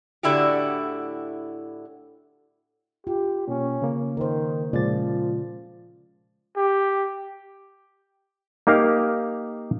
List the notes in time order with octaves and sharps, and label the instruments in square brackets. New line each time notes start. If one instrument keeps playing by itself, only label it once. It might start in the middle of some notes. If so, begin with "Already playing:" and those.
[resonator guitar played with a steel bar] A2 D3 E4 F#4 G4
[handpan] F4 [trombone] G4
[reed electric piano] B2 A#3 [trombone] C#4
[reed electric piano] C#3 A#3
[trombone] D#3 [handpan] A#4 C5
[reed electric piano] A#2 G#3 A6 [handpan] C#3 F4 D5 [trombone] F3
[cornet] G4
[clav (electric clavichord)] A#3 D#4 G4 A#4 F5